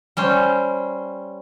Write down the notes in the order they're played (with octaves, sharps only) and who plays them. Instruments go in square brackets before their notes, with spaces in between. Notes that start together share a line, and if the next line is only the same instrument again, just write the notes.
[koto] G3 C#4 C5